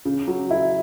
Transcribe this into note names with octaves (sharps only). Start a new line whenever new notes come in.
C#3
F#3
E4